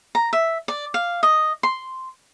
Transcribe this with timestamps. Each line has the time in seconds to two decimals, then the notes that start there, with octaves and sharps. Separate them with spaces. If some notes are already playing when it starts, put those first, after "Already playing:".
0.15 A#5
0.33 E5
0.68 D5
0.94 F5
1.23 D#5
1.63 C6